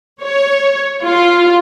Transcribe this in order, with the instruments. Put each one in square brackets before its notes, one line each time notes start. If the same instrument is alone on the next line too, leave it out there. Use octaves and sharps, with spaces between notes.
[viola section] C#5
F4